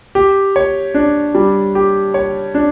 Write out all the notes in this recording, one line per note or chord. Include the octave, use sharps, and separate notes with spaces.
G4
C#5
D4
G3
G4
C#5
D4